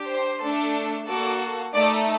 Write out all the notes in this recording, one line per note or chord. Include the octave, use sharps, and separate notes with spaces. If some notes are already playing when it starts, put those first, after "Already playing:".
Already playing: D4 G4
C5
A3 D4 A4
A#3 F#4 A4 D5
A3 D#4 A4 D5